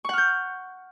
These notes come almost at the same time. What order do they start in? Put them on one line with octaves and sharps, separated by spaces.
C#6 F#5 F6 G6